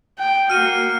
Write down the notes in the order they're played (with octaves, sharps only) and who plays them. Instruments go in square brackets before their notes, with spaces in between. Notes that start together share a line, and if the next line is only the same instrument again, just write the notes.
[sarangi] G5
[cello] A#3 F#4 [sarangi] F#5 [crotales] F6 D#7